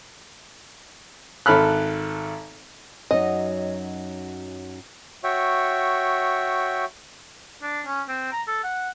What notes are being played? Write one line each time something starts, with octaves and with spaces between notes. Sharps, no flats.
G#1 A4 B5 F6 F#6
F#2 F#3 D#4 D#5
F#4 C#5 E5 G5
D4
C#4
C4
A#5
A4
F#5